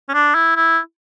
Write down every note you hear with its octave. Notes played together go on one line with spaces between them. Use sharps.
C#4
D4
E4
E4